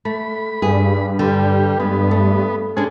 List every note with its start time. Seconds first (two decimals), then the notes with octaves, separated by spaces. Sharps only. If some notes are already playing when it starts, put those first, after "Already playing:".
0.05 A3 B5
0.62 G2 G#4
1.19 D3 G3
1.80 G#3 B3
2.11 A3
2.77 G#3 C#4 D4 G#4